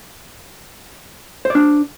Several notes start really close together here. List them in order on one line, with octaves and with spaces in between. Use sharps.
C5 D5 D4